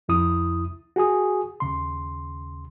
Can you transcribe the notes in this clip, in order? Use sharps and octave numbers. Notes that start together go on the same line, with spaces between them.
C2 F2 E4 D#6
F#4 G#4 G#5 D#6
D#2 C#3 C6